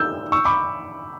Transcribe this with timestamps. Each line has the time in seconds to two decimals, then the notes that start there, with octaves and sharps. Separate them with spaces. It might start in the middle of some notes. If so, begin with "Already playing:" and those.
Already playing: E6 G6
0.32 C#6 E6
0.45 B5 D6